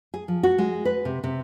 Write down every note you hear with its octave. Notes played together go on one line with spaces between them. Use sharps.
G#4
F3
F#4
G#3
B4
C3
C3